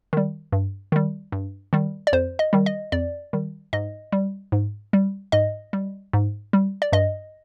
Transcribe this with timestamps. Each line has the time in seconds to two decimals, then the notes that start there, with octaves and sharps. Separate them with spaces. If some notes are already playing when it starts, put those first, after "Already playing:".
0.13 D#3 G3
0.52 G2
0.92 D#3 G3
1.32 G2
1.73 D#3 G3
2.07 D5
2.13 F2 C5
2.39 D#5
2.53 D#3 G3
2.66 D#5
2.92 F2 D5
3.33 D#3 G3
3.73 G#2 D#5
4.12 G3
4.52 G#2
4.93 G3
5.32 G#2 D#5
5.73 G3
6.13 G#2
6.53 G3
6.82 D5
6.92 G2 D#5